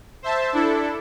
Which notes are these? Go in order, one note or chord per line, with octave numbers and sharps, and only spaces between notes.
C5 E5 A5
D4 E4 A4